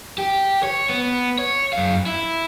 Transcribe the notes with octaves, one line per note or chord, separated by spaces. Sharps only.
G4
C#5
B3
C#5
F#2 F5
E4